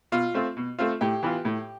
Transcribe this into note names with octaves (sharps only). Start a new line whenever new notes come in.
B2 F4
A3 C4 F4
B2
A3 C4 F4
A2 G4
E3 B3 F4
A2